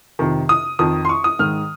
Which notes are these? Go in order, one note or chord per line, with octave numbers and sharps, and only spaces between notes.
F2 C3 D#3
D#6
F2 D#3 D#6
C6
C#6
D#6
G#2 D#3 F6